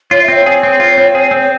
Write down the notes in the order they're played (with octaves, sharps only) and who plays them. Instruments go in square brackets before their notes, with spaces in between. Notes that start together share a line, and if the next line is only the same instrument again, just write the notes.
[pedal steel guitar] F4 [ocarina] C#5
[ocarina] E5
[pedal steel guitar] C4
[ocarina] C#5
[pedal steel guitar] G#4
C4
F4
C4
G#4
C4
[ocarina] C#5